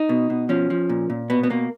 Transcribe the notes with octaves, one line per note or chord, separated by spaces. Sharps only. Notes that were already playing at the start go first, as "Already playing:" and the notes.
Already playing: D#4
B2
B2
F3 C#4
F3
A#2
A#2
B2 B3
B3
B2 A#3